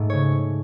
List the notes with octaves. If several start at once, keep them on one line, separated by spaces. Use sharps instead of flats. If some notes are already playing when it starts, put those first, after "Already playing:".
Already playing: G#2 A3
C#3 C#5